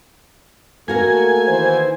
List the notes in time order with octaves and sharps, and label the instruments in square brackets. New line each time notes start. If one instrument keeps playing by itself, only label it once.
[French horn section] A3 A4 [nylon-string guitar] A#3 F#4 A#4 [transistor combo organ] G#5
[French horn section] D#3 E3 [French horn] C5